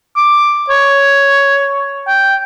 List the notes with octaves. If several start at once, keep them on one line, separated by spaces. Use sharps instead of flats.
D6
C#5
G5